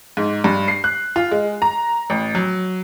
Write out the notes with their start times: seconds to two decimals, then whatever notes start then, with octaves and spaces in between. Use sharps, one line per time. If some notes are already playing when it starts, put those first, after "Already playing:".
0.17 G#2
0.44 G2
0.68 C7
0.84 F#6
1.16 F4
1.31 G#3
1.62 A#5
2.10 A1
2.35 F#3